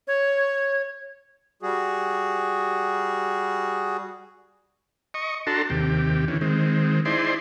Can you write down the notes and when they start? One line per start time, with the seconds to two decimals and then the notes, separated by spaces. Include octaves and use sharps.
0.08 C#5
1.62 G3 F#4 G#4
5.14 D#5 C#6
5.47 D4 F#4 A4 A5 A#5 C6
5.70 D#2 C3 G4
6.28 D3 E3 C#4
6.41 D#3 G#3 C4
7.05 D#4 E4 G#4 C5 D5 C6